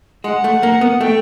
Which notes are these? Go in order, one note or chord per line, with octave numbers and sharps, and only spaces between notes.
G#3 F#5
A3
A#3
B3
A3 G5